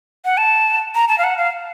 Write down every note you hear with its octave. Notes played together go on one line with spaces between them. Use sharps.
F#5
A5
A#5
A5
F5
F#5
F5